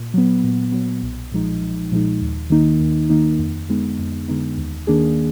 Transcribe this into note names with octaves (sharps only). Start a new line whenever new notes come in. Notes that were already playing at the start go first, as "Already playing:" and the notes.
Already playing: A#2
F#3 B3
A#2
F#3 B3
B1
A#2 F3 G#3 D#4
B1
A#2 F3 G#3 D#4
D#2
D#3 A#3 D#4
D#2
D#3 A#3 D#4
F2
D3 G#3 B3 D#4
F2
D3 G#3 B3 D#4
D#2
D#3 A#3 D4 G#4